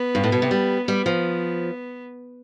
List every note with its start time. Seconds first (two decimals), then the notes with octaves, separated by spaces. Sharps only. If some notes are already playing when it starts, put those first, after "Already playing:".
Already playing: B3
0.15 G2
0.24 A2
0.32 B2
0.42 C3
0.51 G3
0.87 G3 B3
1.06 F3